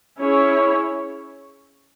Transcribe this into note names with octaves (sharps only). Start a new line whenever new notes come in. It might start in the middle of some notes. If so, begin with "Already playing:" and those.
C#4 E4 G#4 C#5